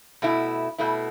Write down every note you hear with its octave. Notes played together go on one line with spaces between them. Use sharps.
B2 A3 E4
B2 A3 E4